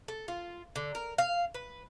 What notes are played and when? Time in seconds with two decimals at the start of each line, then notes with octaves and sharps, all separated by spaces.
0.08 A4
0.28 F4
0.76 D3
0.95 A#4
1.18 F5
1.54 B4